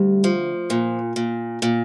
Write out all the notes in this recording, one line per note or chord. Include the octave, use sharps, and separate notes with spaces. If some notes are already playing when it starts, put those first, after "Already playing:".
Already playing: D2 G3
F3
A#2
A#2
A#2